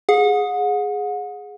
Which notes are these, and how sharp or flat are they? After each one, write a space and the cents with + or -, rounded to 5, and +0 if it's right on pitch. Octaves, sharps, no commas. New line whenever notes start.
G#4 +0 F#5 -35